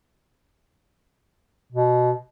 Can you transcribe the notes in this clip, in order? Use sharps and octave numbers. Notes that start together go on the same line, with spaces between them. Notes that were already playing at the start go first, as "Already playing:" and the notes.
B2